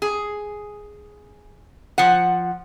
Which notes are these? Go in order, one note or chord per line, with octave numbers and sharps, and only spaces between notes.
G#4
F3 F#5